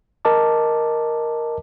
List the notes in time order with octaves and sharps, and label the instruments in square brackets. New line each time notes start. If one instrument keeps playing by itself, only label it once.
[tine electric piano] A#4 D#5 A5 D6